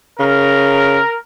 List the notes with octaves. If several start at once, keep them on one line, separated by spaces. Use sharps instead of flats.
C#3 A#4